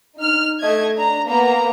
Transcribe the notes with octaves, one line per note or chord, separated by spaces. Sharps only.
D#4 F6
A3 D#5 G#6
D4 A#5
A#3 B3 A#5